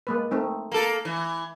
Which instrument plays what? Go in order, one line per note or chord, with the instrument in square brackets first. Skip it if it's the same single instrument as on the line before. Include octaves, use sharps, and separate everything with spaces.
[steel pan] G#3 A#3 B4
A3 C4 D#4
[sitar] A#3 A4
E3